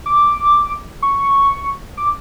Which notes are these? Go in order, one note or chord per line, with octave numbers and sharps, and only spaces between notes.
D6
C#6
D6